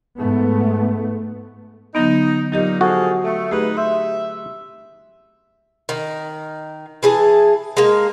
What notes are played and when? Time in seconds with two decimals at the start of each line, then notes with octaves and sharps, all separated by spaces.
0.17 G#2 A3 B3
1.95 D3 F#3 B3 D#4
2.52 A#2 F#3 D#4 G4 D#5
2.81 F3 F#4 G#4 A4
3.24 A3
3.51 A3 D#4 G4 G#4 B4
3.77 E5 C6 G6
5.89 D#3
7.03 E3 G#4 A5
7.77 G#3 A#3